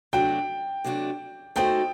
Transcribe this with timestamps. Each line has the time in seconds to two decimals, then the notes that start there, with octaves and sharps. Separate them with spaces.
0.13 C3 F#3 A3 D4 F#4 G5
0.84 C3 F#3 A3 D4 F#4
1.56 A3 D#4 F#4 A4 C5 G5